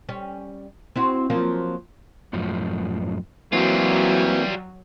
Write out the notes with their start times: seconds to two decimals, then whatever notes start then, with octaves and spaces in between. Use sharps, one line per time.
0.09 G3 C#4
0.96 C4 E4 F#4
1.30 F3 F#3 A#3
2.33 F#2 A2 F3
3.53 E3 F#3 G3 A#3 C4 F4